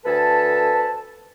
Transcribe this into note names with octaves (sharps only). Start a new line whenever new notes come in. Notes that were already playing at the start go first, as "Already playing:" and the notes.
D2 A4 B4 G#5 A5